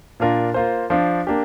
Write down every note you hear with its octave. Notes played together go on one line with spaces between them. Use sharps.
A#2 A#3 D4 F4 A#4
A#3 F4 C5
F3 D4 F4 C5
A#3 D4 G4